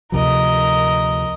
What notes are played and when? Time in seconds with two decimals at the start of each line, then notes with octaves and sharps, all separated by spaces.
0.12 D2 C3 F3 A#4 D#5